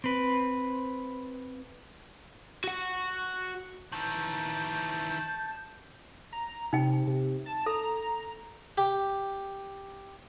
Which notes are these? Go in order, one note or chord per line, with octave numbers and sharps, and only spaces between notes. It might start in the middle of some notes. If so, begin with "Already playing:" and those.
C4 B4
F#4 F#5
D#3 E3 A5 G6
A#5
C3 D#4 G5
C3
A5
A4 A#5
G4